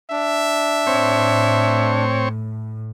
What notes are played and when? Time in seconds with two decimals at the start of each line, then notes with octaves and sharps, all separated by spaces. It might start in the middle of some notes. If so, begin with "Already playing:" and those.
0.11 D4 E5
0.87 A2 C4 C#5